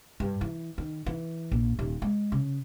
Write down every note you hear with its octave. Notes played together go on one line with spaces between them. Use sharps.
G2
E3
D#3
E3
A#1
D#1
G#3
C#3